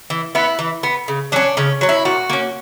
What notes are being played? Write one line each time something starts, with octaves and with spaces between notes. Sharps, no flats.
E3
B3 E4
E3
B3
C#3
F#3 C#4 D4
C#3 C#4
F#3 C#4
E4
A#2 F#4
A#3 C#4